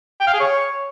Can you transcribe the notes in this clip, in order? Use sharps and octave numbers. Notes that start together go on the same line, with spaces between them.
G5
F5
G#4
C#5